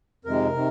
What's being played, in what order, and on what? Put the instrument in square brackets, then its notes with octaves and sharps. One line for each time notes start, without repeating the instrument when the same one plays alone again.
[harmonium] F2 C3 D#3 G#3 A#4
C3 D#3